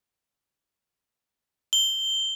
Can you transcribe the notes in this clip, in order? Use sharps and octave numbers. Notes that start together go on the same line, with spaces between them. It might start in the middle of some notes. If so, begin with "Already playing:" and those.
G7